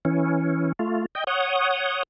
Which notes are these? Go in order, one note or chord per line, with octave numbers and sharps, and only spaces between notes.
E3 C#4
A3 F4
D#5 G5
C#5 F#5 D#6